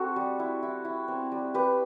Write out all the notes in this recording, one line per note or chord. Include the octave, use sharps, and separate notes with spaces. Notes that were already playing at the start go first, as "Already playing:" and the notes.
Already playing: C4 F#4 A4
G3
E4
E4
E4
C4
G3
G3 G4 B4